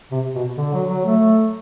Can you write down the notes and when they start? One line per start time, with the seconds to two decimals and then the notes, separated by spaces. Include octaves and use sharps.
0.11 C3
0.35 B2
0.57 D3
0.73 F#3
0.89 F#3
1.05 A3